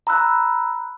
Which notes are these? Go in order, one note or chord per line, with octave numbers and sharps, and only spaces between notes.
A#5 B5 E6 F#6